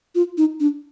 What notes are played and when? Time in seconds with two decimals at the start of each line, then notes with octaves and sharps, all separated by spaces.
0.15 F4
0.38 D#4
0.60 D4